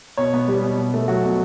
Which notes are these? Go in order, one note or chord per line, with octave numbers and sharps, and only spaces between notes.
B2 C#5
B3
G3
B2
B2
A3
F#3 F#4
B2